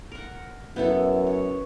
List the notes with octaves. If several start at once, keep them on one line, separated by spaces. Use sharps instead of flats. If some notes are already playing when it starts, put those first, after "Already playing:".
A#4 F#5
F#2 B3 E4 A4
C#5